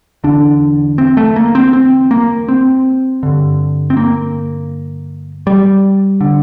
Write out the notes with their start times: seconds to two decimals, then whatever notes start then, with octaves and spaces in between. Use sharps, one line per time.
0.24 E2 D3 D4
0.98 C4
1.17 A3
1.36 A#3
1.55 C4
1.73 C4
2.11 A#3
2.48 C4
3.23 G2 D3
3.90 C4
3.97 A#3
5.47 G3
6.21 D3